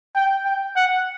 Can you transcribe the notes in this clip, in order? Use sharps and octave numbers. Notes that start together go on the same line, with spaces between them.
G5
G5
F#5